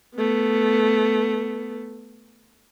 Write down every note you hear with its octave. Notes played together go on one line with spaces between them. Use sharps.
A3 B3